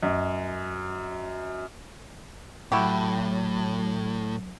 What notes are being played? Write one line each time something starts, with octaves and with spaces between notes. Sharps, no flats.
F#2 D#5
A2 F#3 E4 F#4 G4